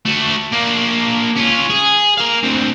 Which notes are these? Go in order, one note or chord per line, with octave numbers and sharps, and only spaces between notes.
A3 F#4
A#3 D4
C#4 F4
G#4
A#3 F5
D2 C4